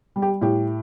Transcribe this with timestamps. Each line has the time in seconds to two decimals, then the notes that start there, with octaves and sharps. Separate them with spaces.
0.16 G3
0.22 G4
0.41 A2 G4